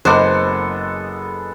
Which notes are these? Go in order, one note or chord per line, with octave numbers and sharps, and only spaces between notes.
F#1 G#3 B3 A4 C5 D6